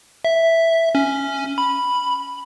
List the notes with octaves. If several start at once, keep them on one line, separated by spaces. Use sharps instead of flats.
E5
C#4
B5